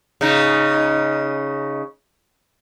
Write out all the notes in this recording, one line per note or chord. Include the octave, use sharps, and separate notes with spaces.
C#3 D#4